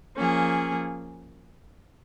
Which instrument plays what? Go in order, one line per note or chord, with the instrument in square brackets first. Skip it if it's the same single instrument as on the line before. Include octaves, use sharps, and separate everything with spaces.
[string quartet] F3 A#3 C#4 G#4